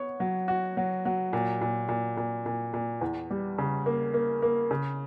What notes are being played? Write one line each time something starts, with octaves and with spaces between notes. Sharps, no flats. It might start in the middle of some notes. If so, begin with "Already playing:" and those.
Already playing: B3 C#5
F#3
F#4
F#3
F#3
A#2
A#2
A#2
A#2
A#2
A#2
E2
G3
C#3
A#3
A#3
A#3
C#3